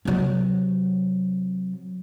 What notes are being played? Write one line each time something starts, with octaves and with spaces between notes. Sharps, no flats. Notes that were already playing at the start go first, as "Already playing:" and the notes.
C3 F#3